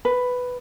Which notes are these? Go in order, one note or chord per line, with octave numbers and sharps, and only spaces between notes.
B4